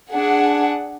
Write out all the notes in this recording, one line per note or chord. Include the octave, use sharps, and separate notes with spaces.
D4 G#4 F#5